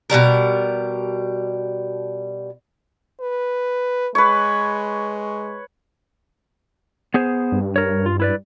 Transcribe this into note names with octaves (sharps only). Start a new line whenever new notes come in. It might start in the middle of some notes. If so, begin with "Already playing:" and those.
B2 F3 G3 A#4
B4
G#3 B4 C#5
B3 G#4 C5
G2
A#4 C#5
F4
E4 B4 D5